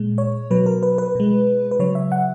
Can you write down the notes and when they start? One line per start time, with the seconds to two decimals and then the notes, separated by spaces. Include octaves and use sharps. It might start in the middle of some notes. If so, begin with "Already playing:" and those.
Already playing: A#2 G#3
0.18 C#5
0.51 B2 F#3 B4
0.66 A#4
0.83 B4
0.98 B4
1.15 B2 G#3
1.71 B4
1.79 C#3 F#3 C#5
1.95 E5
2.12 F#5